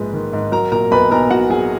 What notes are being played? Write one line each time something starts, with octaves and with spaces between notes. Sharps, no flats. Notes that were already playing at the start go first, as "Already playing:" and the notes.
Already playing: A#1 G#2 G#3 B4
D#3
G#2
F#3 A#4 A#5
A#2 A#4 A#5
B1 B4 B5
B1 A#4 A#5
B1 F#4 F#5
F#3 G#4 G#5